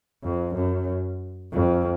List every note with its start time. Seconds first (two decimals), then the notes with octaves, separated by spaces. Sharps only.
0.24 F2
0.55 F#2
1.52 F2